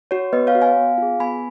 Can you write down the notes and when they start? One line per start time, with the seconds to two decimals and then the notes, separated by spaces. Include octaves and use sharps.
0.11 F#4 C#5
0.33 B3 B4 D#5
0.47 C#5 F5
0.55 F#4
0.61 F5 G#5
0.76 B3
0.98 F4 G#4
1.20 B3 G#5 B5